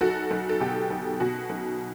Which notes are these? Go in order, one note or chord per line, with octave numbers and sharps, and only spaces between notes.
B1 F#4 A4
B1
A4
B2 G4
B1
B2 F#4
B1